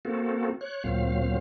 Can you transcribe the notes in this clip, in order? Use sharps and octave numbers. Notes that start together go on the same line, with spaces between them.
A#3 C4 F#4 A4
C#5 F#6
D2 A#2 F#3 C4 F5